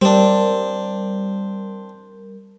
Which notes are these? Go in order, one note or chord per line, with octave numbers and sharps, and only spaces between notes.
G3 C4 D4 A#4